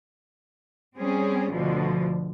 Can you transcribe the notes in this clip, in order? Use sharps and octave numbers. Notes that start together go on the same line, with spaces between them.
G3 C4 C#4 G#4
D2 B2 D3 F3